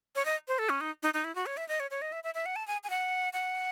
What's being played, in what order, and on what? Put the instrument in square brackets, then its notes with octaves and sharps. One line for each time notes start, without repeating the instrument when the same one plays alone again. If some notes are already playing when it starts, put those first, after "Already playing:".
[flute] C#5
D#5
C5
A4
C#4
D#4
D#4
D#4
E4
F#4
C#5
E5
D#5
C#5
C#5
D#5
E5
E5
E5
F#5
A5
G#5
G#5
F#5
F#5